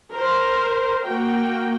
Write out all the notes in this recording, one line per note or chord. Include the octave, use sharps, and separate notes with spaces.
A#4 C5
A#3 F#4 G5